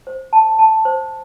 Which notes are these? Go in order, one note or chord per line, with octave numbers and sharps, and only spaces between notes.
C5
A5
A5
C5